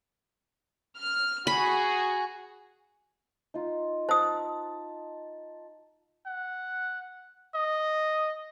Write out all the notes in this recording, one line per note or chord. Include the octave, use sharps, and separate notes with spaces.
F6
F#4 G#4 B5
D#4 F4
C5 A5 D#6
F#5
D#5